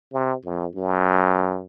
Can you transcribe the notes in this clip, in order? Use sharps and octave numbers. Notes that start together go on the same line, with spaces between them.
C3
F2
F#2